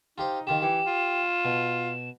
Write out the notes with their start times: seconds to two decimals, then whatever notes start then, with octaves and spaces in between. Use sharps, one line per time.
0.18 D#4 F4 G4 C5
0.47 D#3 F4 G4 E7
0.62 E3 G4
0.86 F4
1.45 B2